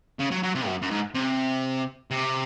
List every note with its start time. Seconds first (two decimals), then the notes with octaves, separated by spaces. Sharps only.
0.19 C#3
0.31 F#3
0.43 F#3
0.55 C3
0.66 F#2
0.82 F#2
0.91 G#2
1.14 C3
2.11 C3